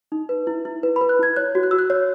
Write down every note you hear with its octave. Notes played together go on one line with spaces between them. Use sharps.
D#4
B4
E4
E4
B4
B5
B4
F#6
E4 G#6
C#5 F#6
F#4
F#6
F#4 E6
F#6
C#5